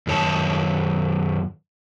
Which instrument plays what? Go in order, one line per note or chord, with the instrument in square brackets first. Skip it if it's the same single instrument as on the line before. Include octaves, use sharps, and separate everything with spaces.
[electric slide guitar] F#2 D#3 C#5 A5